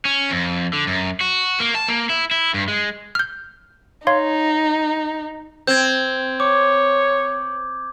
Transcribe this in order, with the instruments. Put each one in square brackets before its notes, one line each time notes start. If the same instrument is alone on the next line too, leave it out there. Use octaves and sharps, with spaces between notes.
[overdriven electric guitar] C#4
F2
D3
F#2
F#4
A#3
A5
A#3
E4
E4
G2
G#3
[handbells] F6 G6
[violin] D#4 [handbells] C#5 F5 C6
[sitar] C4 [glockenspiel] G6 G#6
[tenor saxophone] C#5 [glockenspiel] D6